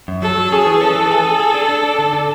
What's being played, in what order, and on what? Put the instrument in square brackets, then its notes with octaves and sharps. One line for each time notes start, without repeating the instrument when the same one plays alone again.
[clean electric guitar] F#2
[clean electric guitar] F#3 [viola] A4
[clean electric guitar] F#3
[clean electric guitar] C#4 [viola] G#4
[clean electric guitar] E3
[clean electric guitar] C#4 [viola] A4
[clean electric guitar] E3
G#4
G#4
G#4
D4
D4
D4
D3
D3